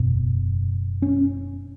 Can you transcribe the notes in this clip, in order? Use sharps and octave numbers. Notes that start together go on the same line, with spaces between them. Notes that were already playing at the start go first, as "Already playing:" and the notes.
Already playing: F#1 E2 B2
C#4